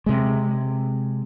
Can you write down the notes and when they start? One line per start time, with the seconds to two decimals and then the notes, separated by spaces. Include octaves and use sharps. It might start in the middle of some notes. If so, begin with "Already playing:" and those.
0.06 C3 G#3